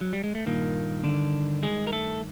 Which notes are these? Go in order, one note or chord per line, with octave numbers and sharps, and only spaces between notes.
F#3
G3
G#3
A3
G2 A#2 D#3 A#3
D3 D4
G#3 G#4
A#4
A3 A4